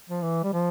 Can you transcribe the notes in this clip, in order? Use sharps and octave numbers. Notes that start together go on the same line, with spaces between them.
F3
E3
G3
F3